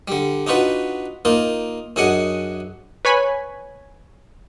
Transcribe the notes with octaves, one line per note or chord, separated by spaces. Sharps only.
D3 G3
D4 D#4 F4 F#4 B4
A#3 D#4 F4 A#4
F#2 D4 G#4 D#5 F#5
B4 C#5 G#5 B5